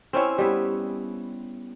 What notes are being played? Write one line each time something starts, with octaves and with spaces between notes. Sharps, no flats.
C4 C#4 E4 C#5
G3 B3 E4